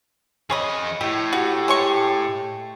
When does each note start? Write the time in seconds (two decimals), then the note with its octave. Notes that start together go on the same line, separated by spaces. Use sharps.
0.50 F2 G#4 C#5 D#5 B5
1.01 A2 G4
1.33 F#4 G4
1.68 G#3 C#5 C#6